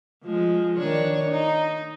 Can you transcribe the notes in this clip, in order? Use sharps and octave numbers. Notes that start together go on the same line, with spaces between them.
F3 G#3
D#3 D4 C#5
D#4